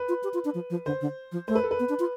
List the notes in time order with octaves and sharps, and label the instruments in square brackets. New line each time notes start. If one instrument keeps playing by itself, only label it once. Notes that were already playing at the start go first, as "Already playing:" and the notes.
Already playing: [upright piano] B4
[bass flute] F4
G4
F4
D4
F3
F3
[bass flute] D3 [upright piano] C5
[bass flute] D3
F3
[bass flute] A3 [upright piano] C5
[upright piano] B4
A4
B4
[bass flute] B3
D4
F4